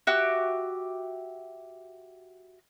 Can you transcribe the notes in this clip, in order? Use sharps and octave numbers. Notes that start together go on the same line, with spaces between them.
F#4 G4 E5